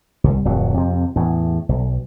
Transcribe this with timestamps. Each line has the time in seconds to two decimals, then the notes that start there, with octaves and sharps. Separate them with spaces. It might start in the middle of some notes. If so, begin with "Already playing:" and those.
0.24 C2
0.45 D1 F2 F#3
0.74 F2 C3
1.16 E2 A2
1.69 B1